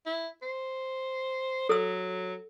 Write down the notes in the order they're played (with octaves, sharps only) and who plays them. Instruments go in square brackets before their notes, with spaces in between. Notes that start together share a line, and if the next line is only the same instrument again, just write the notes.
[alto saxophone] E4
C5
[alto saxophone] F#3 [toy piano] A4 E6